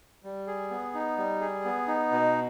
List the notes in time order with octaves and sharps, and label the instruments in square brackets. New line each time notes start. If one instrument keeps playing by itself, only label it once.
[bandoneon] G3
G#4
B3
D#4
G3
G#4
B3
D#4
B2